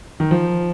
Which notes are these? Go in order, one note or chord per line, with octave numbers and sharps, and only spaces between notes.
D#3
F3